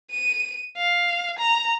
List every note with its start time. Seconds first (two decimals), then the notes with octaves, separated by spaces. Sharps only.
0.10 D#7
0.77 F5
1.39 A#5